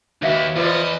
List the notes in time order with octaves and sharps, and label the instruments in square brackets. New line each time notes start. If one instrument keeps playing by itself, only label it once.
[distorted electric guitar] D#2 [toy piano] D4 E5 F5 [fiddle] F#4 B4
[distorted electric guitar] E2 [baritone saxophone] F3 [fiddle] B4 D#5